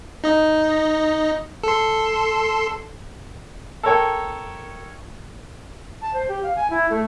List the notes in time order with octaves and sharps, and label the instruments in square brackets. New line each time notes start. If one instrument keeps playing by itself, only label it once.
[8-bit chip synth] D#4 D#5
A4 C6
[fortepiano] A4 A#4 C#5 G5
[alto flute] A5
C5
G4
F5
G#5
E4
A3